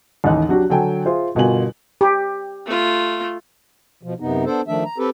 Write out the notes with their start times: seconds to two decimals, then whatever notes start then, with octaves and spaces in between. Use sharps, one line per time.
0.24 A1 D#2 D#4 F#6
0.49 F#3 D4 F#4 G4
0.69 D3 F#3 A4 G5 G#5
1.05 F4 G#4 C5 E5
1.35 G1 B2 F4 A#4 G#5 F#7
2.01 G4
2.66 A3 F4
4.03 B2 F3
4.20 F#2 C3 B3 D#4
4.45 B3 D4 A4 C5
4.68 D#3 F3 A3 D4 E5
4.84 A#5
4.98 C4 G4 A4 B4